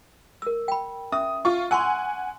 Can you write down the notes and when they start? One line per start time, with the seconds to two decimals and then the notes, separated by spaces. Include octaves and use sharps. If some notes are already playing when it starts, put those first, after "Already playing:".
0.42 A#4 E6
0.68 G5 B5
1.12 C#4 E5 D#6
1.45 F4 C#6
1.71 F#5 G#5 C6 C#6 E6